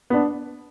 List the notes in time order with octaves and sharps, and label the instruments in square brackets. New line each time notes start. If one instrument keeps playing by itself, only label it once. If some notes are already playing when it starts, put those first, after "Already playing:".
[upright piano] B3 D4